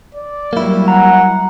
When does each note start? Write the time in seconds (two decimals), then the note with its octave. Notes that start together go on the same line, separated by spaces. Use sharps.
0.15 D5
0.53 F#3 G3 A#3 E4
0.88 F#5 A#5